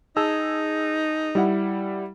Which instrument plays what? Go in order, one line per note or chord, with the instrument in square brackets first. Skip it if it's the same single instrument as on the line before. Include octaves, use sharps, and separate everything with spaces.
[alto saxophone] D#4 [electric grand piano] G#4 A5 E6
[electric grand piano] G3 E4 F#5